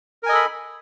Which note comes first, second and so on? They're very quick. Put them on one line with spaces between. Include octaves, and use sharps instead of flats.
A#4 G#5 D#5 A4 B5